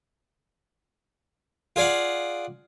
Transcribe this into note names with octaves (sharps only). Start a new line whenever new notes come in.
F4 G#4 D5 F5 F#5